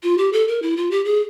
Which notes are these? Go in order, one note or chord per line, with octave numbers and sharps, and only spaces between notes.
F4
G4
A4
A#4
E4
F4
G4
G#4